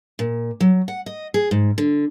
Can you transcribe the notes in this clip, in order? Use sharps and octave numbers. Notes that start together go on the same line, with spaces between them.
A#2
F#3
F#5
D#5
G#4
G#2
D3